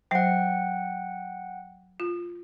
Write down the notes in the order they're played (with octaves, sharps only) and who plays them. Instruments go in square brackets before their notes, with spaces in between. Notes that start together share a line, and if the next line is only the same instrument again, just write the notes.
[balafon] F#3 C5 [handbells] F#5 G5
[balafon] F4